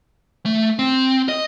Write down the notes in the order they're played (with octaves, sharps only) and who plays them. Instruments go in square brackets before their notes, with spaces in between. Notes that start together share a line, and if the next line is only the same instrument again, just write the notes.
[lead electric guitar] A3
C4
D#5